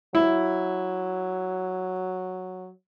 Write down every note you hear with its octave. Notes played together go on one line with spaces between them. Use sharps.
F#3 E4